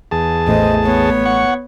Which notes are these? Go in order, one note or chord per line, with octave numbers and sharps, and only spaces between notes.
E2 G#4 A5
A1 A3 C5 D#5
B3 C#5
F#5 C#6